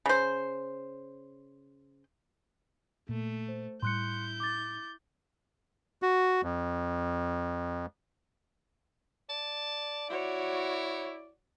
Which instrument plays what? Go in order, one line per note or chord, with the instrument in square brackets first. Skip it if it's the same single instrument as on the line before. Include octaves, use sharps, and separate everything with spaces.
[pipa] C#3 C5
[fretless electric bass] A#2 [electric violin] A3
[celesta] C5
[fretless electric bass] A2 G3 [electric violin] E4 G6 [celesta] C6 F#6 C#7
[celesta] D6 A6
[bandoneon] F#4
F2
[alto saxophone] D5 [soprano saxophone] A5
[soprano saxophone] E4 [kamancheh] F#4 [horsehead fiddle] C#5